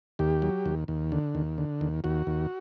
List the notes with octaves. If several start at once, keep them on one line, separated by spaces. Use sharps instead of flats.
D#2 G4
F#3
D#2
D#2
D3
D#2
D3
D#2
D#2 F#4
D#2